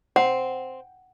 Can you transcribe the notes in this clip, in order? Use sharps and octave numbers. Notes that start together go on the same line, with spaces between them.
C4 F#5